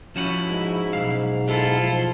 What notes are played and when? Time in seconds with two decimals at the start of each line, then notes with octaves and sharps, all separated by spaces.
0.16 F3 C#4 E4 F#4
0.45 G#2
0.93 B1 C3 F5
1.47 E4 F4 A4
1.79 F3